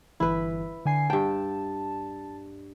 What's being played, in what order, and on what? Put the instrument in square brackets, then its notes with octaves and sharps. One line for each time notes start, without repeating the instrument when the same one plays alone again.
[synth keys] G1 E3 [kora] E4 B4
[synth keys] D3 G#5 C7
[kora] G2 G5 [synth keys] A5